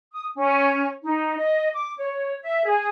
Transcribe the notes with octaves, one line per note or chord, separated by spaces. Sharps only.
D#6
C#4
D#4
D#5
D6
C#5
E5
G#4